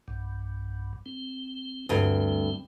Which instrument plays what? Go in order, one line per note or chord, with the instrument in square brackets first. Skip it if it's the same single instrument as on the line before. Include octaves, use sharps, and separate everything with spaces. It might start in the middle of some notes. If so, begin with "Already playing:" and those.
[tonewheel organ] B1 G2
C4
[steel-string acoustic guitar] D2 G2 [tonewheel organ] C4